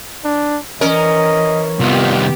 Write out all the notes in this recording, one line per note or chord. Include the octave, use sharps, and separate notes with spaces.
D4
E3 C#4 A#4 D#5
C2 D#3 B3 F4 G4